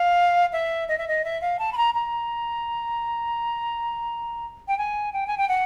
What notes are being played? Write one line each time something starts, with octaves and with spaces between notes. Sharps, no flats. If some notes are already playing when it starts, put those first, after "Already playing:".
Already playing: F5
E5
D#5
E5
D#5
E5
F5
A5
B5
A#5
A#5
G5
G#5
G5
G#5
G5
F#5